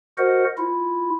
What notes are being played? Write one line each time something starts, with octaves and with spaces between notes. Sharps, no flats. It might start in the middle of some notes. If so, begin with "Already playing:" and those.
F#4 A#4 C5 D#5 F#5
E4 F4